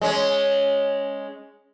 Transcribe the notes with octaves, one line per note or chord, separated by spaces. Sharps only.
G#3 C#4